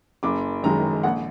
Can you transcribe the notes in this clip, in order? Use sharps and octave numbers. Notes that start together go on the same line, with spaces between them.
F#1 D6
F#2 D#3 G#3 A#5
A#1 F#5